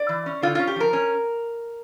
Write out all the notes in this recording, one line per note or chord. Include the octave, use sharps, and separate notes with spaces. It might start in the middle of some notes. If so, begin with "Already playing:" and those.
Already playing: D5
E3
C#4
D3 F4
C#4 F4
G4
F3 A#4
C#4